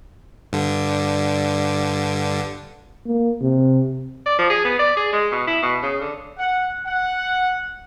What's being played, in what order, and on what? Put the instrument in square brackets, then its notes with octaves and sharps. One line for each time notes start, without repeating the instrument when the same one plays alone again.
[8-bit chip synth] G2 D3
[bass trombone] A#3
C3
[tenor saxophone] D5
F3
G#4
B3
D5
G#4
G#3
B2
E4
B2
C#3
D3
[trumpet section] F#5
F#5